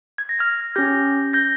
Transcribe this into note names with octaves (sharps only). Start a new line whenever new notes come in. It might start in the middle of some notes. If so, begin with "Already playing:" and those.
G#6
A#6
F6 G#6
C#4 G4 G6 A#6
G6 A#6